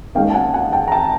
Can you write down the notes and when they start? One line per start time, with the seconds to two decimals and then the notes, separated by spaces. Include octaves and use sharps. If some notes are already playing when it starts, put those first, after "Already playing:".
0.15 D#2 D#3 G#3 C#4 F5 G5
0.30 A5
0.34 F#5 G#5
0.54 F#5 G#5
0.73 G5 A5
0.88 A#5
0.92 G5 A5